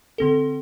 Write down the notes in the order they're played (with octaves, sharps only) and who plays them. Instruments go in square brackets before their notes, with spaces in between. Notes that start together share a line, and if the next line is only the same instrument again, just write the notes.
[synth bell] D3 C4 A4